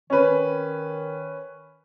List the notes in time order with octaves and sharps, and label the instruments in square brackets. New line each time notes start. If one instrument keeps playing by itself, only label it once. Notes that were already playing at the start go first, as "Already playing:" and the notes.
[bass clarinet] D#3 [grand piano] C#4 B4